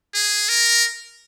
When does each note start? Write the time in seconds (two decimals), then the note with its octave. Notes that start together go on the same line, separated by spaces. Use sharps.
0.14 G#4
0.49 A#4